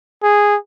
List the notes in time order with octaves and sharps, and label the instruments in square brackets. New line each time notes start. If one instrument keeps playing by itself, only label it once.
[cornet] G#4